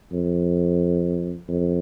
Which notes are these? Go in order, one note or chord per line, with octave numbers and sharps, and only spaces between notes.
F2
F2